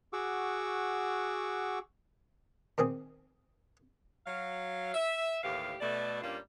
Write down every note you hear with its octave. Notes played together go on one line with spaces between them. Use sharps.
F#4 G#4 F#5 C#6 D6 E6
A#2 D#3 C4 G#4
F#3 F5
E5
D#2 A2 E3 G4 F5
B2 A3 D5
G2 G3 A#3 C#4 D4 F4